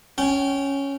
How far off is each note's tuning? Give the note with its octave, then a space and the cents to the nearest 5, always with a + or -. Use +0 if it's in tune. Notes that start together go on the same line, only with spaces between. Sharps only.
C#4 +0 G5 -25